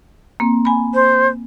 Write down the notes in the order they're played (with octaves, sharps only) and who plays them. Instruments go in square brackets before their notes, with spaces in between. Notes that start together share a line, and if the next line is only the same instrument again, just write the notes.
[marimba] A#3 C4
G#5 B5
[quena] C5